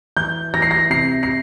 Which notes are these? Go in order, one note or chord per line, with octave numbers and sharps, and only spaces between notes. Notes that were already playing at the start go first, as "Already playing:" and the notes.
E3 G6
E3 A#6
C7
A#6
C3 C7
C7